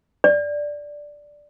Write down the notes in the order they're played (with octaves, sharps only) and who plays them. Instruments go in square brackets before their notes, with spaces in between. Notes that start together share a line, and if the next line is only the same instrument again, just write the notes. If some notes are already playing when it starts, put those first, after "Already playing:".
[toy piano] D5